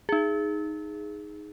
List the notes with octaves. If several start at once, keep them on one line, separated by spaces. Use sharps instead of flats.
D#4 G#4